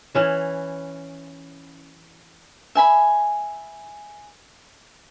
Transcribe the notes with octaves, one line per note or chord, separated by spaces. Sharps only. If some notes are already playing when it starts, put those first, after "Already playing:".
E3 C#4 E4
E5 G#5 B5